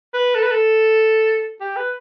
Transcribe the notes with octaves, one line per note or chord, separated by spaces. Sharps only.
B4
A4
B4
A4
G4
B4